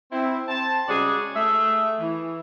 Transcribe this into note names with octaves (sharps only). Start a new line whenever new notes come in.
C4 E4
C4 A5
C#3 G3 G#3 F#4 G#4 D5
A3 G#4 E5
E3